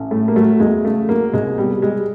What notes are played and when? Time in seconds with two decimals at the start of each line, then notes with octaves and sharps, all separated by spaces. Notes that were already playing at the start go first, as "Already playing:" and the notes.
Already playing: A1
0.11 A2 A3
0.28 A#3
0.36 F#3 A3
0.60 E2 G#3
0.84 C#3 A3
1.09 F#3 A#3
1.33 C2 G#3
1.58 B2 G3
1.82 G3 G#3